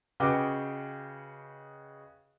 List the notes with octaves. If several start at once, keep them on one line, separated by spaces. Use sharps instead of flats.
C#3 F#4 B4 D#5 G5 D6